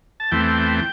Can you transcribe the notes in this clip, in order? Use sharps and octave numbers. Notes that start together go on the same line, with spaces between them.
A5
E2 E3 A3 C4 G5
G5